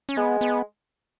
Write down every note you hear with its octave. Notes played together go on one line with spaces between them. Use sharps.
C#4
G#3 B3
B3